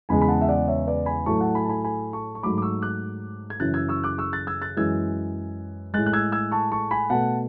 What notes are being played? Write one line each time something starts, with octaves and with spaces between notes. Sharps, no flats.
E2 C#3 G#3 G#5 B5
B5
F#5 A5
E5
D5 F#5
C#5 E5
B4 D5
G#5 B5
A2 F#3 A3 A5 C#6
F#5 A5
G#5 B5
A5
G#5 B5
G#5 B5
A5 C#6
C#6
G#2 F#3 A3 B5 D6
D6
C#6 E6
D6 F#6
G#6
F#2 C#3 E3 F#6 A6
E6 G#6
C#6 E6
D6 F#6
C#6 E6
F#6 A6
E6 G#6
F#6 A6
F#2 E3 G#3 E6 G#6
A2 G#3 F#6 A6
F#6
E6 G#6
E6 G#6
A5 C#6
A5 C#6
G#5 B5
B2 A3 F#5 A5